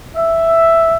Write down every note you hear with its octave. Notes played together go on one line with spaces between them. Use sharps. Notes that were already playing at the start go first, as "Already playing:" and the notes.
E5